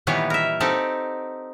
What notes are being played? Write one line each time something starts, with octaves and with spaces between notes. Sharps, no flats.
A#2 D#3 E3 G3 B3 C#5
A#4 E5
C4 D#4 G4 A4 F#5